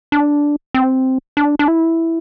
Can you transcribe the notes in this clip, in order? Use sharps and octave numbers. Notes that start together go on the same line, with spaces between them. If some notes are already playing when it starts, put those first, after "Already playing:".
D4
C4
D4
D4
E4